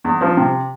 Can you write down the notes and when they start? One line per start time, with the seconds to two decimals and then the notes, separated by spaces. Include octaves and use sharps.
0.04 E2
0.21 F3
0.37 C3